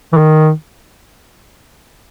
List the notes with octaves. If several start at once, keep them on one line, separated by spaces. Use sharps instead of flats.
E3
D#3